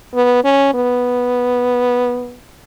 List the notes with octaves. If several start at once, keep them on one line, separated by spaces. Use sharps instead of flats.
B3
C#4
B3